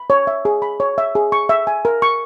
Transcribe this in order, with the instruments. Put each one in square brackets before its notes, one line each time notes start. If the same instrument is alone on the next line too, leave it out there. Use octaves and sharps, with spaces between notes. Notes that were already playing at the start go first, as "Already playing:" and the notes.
Already playing: [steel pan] B5
C#5
E5
G#4
B5
C#5
E5
G#4
C#6
E5
G#5
A#4
C#6